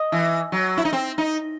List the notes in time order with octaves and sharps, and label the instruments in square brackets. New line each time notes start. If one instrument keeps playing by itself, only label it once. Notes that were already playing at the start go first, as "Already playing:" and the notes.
Already playing: [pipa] D#5
[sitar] E3
F#3
E4
D#4
C4
D#4